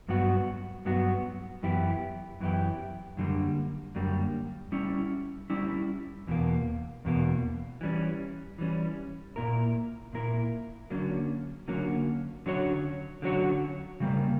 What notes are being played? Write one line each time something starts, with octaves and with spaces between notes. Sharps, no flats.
G2 F#3 B3 F#4
G2 F#3 B3 F#4
F#2 E3 B3 E4 G4
F#2 E3 B3 E4 G4
F#2 D3 G3 A#3
F#2 D3 G3 A#3
G3 C#4 E4
G3 C#4 E4
E2 B2 A#3
E2 B2 A#3
E3 G3 C#4
E3 G3 C#4
A#2 A#3 E4 A#4
A#2 A#3 E4 A#4
D3 F#3 A#3 C#4
D3 F#3 A#3 C#4
D3 F#3 C#4 F#4 C#5
D3 F#3 C#4 F#4 C#5
C#3 G3 A#3